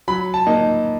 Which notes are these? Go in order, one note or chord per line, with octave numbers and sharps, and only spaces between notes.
F#3 B5
A5
A#3 D#4